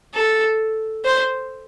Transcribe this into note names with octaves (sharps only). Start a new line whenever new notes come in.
A4
C5